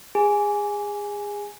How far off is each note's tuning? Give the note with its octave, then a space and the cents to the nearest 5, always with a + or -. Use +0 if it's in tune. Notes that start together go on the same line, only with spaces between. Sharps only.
G#4 -25 G#5 +0